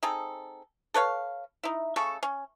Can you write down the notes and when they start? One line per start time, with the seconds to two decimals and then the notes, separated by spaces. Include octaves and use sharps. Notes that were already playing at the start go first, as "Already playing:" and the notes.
0.03 C4 D#4 G#4 A4
0.94 A4 B4 C#5 F5
1.63 D#4 E4
1.96 C#3 A3 A4 C#6
2.23 C#4